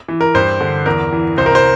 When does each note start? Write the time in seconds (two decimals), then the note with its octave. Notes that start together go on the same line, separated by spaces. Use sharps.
0.08 E3
0.21 A#4
0.34 G2 C5
0.61 D3
0.86 E2 A#4
1.13 E3
1.37 C2 C5
1.46 A#4
1.55 C5